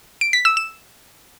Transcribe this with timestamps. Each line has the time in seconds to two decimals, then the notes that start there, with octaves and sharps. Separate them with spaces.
0.21 D7
0.33 B6
0.45 E6
0.57 E7